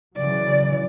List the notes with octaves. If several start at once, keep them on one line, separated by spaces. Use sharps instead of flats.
C#3 E3 F#3 D5